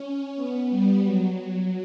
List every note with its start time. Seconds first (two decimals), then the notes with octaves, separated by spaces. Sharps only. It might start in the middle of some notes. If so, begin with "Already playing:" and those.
Already playing: C#4
0.36 B3
0.70 G3
1.04 F#3